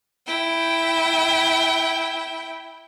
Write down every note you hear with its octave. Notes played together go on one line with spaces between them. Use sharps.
E4 G5